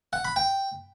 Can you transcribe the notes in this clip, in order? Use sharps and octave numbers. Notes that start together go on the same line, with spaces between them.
F#5
B5
G5